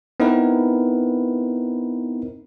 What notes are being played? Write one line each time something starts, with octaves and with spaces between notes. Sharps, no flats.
B3 C4 D#4 E4 A#4 B4